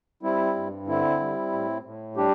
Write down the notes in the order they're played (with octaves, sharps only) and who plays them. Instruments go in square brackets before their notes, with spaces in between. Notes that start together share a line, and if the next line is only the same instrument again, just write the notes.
[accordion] G3 C4 E4
G2
D3 C4 E4
G3
A2
A2
G3 D4 G4